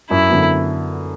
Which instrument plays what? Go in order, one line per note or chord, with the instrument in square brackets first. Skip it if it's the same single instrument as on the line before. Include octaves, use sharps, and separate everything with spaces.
[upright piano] F#2 [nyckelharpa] E4
[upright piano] D3 F#3 B3